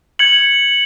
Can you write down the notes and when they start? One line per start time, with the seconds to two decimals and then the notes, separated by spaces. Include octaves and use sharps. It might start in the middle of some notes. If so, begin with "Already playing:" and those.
0.19 G#6 C#7 F#7